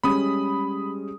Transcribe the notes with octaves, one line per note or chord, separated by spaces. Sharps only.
G3 G#3 C#4 B5 D#6